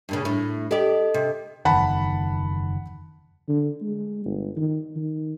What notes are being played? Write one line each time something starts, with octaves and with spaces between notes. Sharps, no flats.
G2 A#2 C#3
A2
G4 A4 D5 D#5
C3
F#1 E2 D#3 F#5 A5 B5
D3
G#3
G1
D#3
D#3